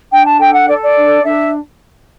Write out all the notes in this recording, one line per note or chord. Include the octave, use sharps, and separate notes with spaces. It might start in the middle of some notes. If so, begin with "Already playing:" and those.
D4 G5
A5
A4 G5
F#5
A4 D5
D5
D4
D4 E5